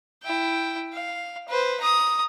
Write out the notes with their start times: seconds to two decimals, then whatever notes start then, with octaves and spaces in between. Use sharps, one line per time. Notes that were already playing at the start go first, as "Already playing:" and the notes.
0.23 E4 G5
0.93 F5
1.48 B4 C5
1.80 A#5 D#6